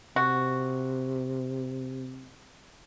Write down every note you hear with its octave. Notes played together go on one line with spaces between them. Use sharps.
C3 F#4